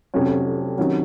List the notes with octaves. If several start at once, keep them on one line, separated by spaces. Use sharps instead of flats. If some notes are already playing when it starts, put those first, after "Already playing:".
F1 F2 C3 F#3 C#4
C3 D#3 F#3 C#4